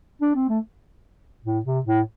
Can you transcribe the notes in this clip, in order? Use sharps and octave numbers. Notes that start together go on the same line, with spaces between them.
D4
C4
A3
A2
C3
A2